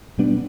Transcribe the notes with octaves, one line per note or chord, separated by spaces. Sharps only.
B2 G3 B3 D4